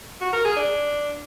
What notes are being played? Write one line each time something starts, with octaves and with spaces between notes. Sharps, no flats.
F#4
A#4
G#4
D4